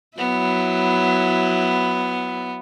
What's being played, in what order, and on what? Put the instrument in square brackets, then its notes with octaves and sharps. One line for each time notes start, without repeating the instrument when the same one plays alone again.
[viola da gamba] F#3 E4 [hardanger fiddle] B3